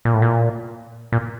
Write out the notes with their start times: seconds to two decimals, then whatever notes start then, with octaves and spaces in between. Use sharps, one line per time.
0.05 A#2
0.14 A2
0.22 A#2
1.12 A#2